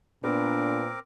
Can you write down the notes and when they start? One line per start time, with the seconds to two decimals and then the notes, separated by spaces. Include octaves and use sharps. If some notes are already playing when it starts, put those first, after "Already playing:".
0.24 A#2 B3 C4 D4 A#4 D6